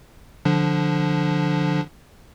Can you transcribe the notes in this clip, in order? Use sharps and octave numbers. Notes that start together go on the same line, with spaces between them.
D3 F3 D4